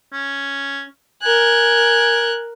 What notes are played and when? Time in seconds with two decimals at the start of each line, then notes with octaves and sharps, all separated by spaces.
0.13 C#4
1.23 A#4 G#5 F#6